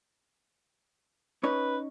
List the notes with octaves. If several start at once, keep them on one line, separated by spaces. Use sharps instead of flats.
C#4 D#4 B4 C#5